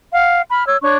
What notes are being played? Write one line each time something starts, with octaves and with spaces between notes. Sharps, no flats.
F5 F#5
B5 F6
C#5 E6
D4 C#5 C#6 F#6